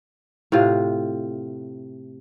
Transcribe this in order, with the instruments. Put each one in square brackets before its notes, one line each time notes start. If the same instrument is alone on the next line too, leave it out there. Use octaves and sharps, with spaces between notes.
[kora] A2 C3 F4